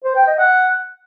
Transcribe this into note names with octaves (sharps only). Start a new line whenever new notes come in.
C5
G5
D#5
F#5